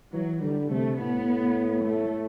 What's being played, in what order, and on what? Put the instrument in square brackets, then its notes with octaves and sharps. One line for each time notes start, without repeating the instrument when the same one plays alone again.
[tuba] E3 [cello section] F#3
[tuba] D3 [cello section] G3
[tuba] C3 [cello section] A3
[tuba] A2 [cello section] B3
[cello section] A3